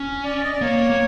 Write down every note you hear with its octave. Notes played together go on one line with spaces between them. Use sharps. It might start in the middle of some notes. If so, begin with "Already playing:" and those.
Already playing: C#4
D5
D#5
D5
A#3 C#5
A#3